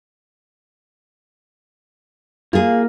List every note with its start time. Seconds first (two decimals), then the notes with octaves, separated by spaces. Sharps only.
2.53 A#3 F4 G#4